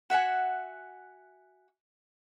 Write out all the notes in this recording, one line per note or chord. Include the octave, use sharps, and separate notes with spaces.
F#4 E5 F#5 G#5